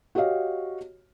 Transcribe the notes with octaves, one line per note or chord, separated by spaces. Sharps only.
F#4 G4 C#5 D#5 F5